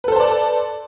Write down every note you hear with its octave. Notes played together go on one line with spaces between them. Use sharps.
A4 B4 C5 D5 A5